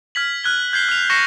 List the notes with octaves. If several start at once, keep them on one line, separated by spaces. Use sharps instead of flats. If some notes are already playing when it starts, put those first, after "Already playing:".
F6 G#6 B6 F#7
F6 F#6 G#6 G7
G6 G#6 C7 G7
F6 F7
C#6 A#6 C7 C#7 E7 G7